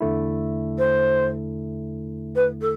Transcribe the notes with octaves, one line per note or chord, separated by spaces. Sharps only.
E2 D3 A3 E4
C5
B4
A4